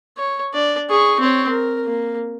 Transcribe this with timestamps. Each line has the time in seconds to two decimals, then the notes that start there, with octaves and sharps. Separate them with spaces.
0.18 C#5
0.54 D4 D5
0.90 G#4 C#6
1.20 C4 C#5
1.49 A#4
1.85 A#3